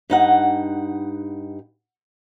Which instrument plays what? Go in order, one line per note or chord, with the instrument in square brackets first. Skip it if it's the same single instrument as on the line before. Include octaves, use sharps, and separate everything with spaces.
[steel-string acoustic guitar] G2 D#4 F#5